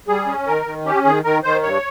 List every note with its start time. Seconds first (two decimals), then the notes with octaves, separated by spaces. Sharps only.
0.08 G3 G#4
0.27 C#4
0.46 D#3 A#4
0.66 D#3
0.85 C#4 G4
1.05 D#3 G#4
1.24 D#3 A#4
1.44 D#3 C5
1.63 G2 C#5